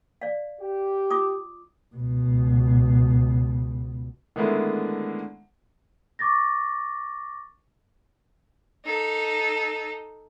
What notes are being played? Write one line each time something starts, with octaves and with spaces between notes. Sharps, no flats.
D5 F5
G4
F4 D6 D#6
C#2 B2
D3 D#3 G#3 A3 B3 E4
C#6 D6 A6 A#6
D#4 A4